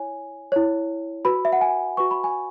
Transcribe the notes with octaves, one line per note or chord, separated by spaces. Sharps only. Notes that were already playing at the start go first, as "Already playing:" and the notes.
Already playing: E4 C#5 G#5
E4 C#5
F#4 B4 B5
E5
F#5
G#5
F#4 B4 C#6
B5
G#5